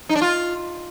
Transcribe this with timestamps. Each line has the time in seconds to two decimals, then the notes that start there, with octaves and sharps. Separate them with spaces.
0.09 D#4
0.15 D4
0.22 F4